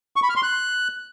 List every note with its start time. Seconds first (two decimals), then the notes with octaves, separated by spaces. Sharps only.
0.16 C#6
0.23 B5
0.30 F6
0.36 C6
0.43 F#6